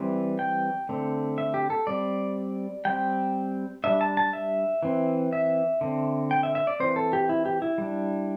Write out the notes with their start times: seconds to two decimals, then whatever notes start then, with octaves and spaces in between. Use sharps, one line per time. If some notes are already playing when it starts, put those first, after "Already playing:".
Already playing: E3 G3 C4
0.39 G5
0.89 D3 A3 C4
1.38 E5
1.54 G4
1.70 A4
1.87 G3 C4 D5
2.85 G3 C4 G5
3.84 G3 D4 E5
4.01 A5
4.17 A5
4.33 E5
4.83 E3 C4
5.33 E5
5.81 D3 C4
6.31 G5
6.43 E5
6.55 E5
6.67 D5
6.80 E3 C4 C5
6.96 A4
7.13 G4
7.29 E4
7.46 G4
7.62 E4
7.78 G3 D4